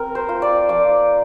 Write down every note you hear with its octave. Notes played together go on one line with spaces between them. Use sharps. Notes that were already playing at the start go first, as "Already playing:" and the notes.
Already playing: C4 A#4
C5
F4
D5
F3 D5